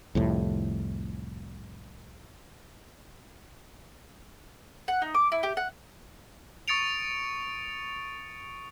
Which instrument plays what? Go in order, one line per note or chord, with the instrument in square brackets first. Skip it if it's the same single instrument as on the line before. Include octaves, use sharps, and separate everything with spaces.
[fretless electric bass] C2 F2 A2
[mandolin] F#5
D#4
D6
E4
G4
F#5
[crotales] C#6 D#6 A6 C#7 D7 F7